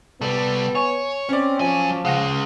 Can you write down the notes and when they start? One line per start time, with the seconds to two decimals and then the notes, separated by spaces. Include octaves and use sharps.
0.21 C2 G3 B3 A4
0.75 C#5 G#5
1.29 C4 C#4 D5
1.60 F3 F#3 G#5
2.05 C#3 G#3 F5 F#5 A#6